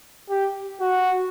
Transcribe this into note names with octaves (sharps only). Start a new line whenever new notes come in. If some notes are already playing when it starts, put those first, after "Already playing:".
G4
F#4